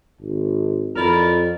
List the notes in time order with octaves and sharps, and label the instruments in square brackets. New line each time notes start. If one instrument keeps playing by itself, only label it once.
[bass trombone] G#1
[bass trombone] F2 [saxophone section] E4 A#4 D5